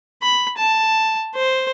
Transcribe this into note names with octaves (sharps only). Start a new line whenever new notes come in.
B5
A5
C5